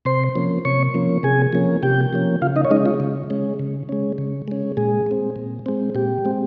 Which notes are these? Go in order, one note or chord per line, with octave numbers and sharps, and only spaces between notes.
C3 C5 C6
F3 A#3 C#4
C3 C#5 C#6
F3 A#3 C#4
C3 G#4 G#5
F3 A#3 C#4
C3 G4 G5
F3 A#3 C#4
C#3 F4 F5
D#4 D#5
C#5
G#3 C#4 D#4 D#5
F4
C#3
G#3 C#4
C#3
G#3 C#4
C#3
G#3 C#4
A#2 G#3 G#4
G#3 C4
A#2
G#3 C4
A#2 G4
G#3 C4